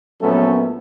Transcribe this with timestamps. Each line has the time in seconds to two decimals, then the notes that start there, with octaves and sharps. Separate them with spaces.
0.21 A#1 F#3 A3 B3 C#4 A4